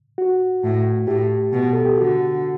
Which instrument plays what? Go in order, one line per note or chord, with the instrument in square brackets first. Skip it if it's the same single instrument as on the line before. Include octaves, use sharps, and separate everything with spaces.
[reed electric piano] F#4
[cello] A2
[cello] A2 [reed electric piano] G4
[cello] B2
[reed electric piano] A4
G4
[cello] D3 [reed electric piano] F#4